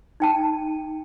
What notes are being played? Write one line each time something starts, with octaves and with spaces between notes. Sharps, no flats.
D#4 G5 A5